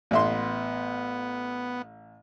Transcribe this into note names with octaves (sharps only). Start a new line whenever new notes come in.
A1 B3 E5 C6